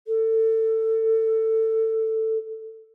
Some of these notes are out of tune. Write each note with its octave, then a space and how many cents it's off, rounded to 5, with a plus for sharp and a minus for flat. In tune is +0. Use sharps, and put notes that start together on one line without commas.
A4 +20